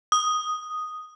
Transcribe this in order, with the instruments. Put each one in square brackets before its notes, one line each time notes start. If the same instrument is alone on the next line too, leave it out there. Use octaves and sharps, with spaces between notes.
[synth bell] D#6